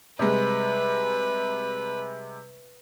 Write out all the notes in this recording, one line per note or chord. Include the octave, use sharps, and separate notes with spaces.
C3 G3 G#3 B4